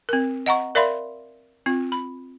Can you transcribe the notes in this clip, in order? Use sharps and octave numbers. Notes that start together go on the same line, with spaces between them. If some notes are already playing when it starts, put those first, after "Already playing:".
C4 A#4
D#5 F#5 A#5 C#6
A#4 D5 E5 F5 B5 C6
C4 F4
B5